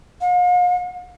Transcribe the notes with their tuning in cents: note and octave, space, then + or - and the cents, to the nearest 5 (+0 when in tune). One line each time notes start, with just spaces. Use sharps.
F5 +40